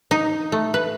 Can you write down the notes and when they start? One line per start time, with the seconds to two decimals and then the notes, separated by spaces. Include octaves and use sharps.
0.11 D#4
0.52 A3
0.74 B4